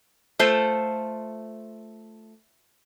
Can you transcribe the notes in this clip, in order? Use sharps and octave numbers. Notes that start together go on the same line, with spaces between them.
A3 F4 A4 C5